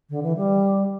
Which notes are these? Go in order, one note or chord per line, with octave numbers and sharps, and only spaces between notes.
D3
E3
G3